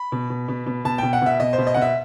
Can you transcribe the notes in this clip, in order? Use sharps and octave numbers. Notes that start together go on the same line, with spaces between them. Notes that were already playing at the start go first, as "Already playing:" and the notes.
Already playing: B5
B2
B2
B2
B2
B2 A5
B2 G5
F#5
B2 E5
B2 D#5
C5
B2
D#5
B2 F#5
E5